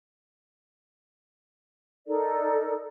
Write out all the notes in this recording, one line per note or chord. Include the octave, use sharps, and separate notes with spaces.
D#4 A4 A#4 D5